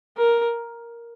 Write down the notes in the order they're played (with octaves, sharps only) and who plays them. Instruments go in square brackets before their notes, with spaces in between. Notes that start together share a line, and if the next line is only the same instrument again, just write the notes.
[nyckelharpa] A#4